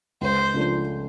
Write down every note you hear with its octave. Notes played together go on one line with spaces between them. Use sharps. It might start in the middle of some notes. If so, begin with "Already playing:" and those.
C#2 C5
C#3 F3 A3 D4